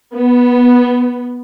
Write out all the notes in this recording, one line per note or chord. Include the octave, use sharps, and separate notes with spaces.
B3